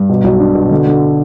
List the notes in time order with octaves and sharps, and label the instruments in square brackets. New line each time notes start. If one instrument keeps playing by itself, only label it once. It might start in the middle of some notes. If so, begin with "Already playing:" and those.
Already playing: [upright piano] G2
B2
B1
D4
B2
D3
D3